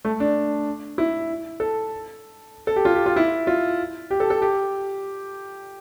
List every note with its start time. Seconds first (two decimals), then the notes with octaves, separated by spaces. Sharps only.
0.05 A3
0.20 D4
0.98 E4
1.60 A4
2.67 A4
2.76 G4
2.85 F4
2.95 G4
3.06 F4
3.16 E4
3.47 F4
4.11 G4
4.20 A4
4.30 A4
4.42 G4